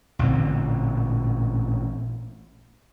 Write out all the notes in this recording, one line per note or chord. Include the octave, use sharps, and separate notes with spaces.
A1 A#2 D3 C4